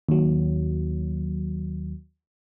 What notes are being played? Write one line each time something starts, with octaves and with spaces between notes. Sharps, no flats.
D#2 F#3